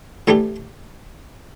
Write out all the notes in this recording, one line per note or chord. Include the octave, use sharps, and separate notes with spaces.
A2 E3 A3 D4 G4